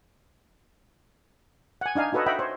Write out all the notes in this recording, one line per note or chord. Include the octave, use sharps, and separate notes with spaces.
F#5 G#5
D4 D#4 F5 G#5
D#4 F#4 A4 B4 C#5 D#5
D#5 E5 F#5 G5 B5
C5 C#5